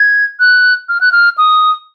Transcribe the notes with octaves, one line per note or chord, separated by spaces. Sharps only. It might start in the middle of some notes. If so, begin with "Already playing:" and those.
Already playing: G#6
F#6
F6
F#6
F6
D#6